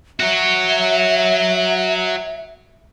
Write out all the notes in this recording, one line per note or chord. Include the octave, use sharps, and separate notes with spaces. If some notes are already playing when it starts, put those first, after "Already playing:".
F#4 C#5 E5